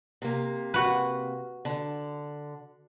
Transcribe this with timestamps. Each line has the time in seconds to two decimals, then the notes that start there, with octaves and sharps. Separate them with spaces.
0.22 C3 A#3
0.74 F#4 B4
1.65 D3 A5